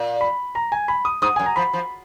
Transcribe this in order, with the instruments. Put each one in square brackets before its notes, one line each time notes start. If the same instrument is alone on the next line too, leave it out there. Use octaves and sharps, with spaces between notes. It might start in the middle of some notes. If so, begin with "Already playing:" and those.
Already playing: [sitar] A#2
[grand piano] B5
A#5
G#5
B5
D#6
[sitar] G#2 [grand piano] D#6
[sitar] F#2 [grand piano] G#5
[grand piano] A#5
[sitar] F3 [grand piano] B5
[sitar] F3